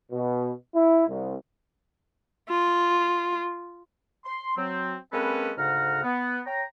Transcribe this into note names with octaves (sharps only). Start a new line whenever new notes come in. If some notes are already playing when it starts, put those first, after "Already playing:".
B2
E4
C2
F4
C6
F#3 C4
G#3 A#3 C4 C#4 A4 B4
D2 G#2 C#3 F#5 A#5 F6
B3
C#5 G5 A#5